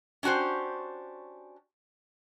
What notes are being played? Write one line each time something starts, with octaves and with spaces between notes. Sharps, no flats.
C#4 D4 F#4 G4 C5